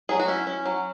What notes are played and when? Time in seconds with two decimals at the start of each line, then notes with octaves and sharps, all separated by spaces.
0.09 F#3 G#4
0.19 F#4
0.28 C#4 E4
0.47 C#4
0.66 F#3